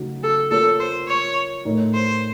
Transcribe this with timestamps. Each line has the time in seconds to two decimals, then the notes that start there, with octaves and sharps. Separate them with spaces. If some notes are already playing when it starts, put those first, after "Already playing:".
Already playing: C#3 F#3 A3 D#4 F#4
0.23 A4
0.51 A#3 F4 A4 A#4 C#5
0.80 C5
1.08 C#5
1.65 A2 A3 D#4 A#4 C#5
1.94 C5